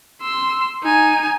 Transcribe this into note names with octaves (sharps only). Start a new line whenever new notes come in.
C6 E6
D#4 G#5